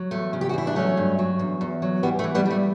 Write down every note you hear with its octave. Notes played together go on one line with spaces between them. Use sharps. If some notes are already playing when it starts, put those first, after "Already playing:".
Already playing: F#3
E2 A3
C#3
G4
F#4
E2 E4
D4
F#3 A3 C#4
G2
F#3
E2
E2
F#3
E3 G3 B3
A3
E3
G3 B3
G3 A3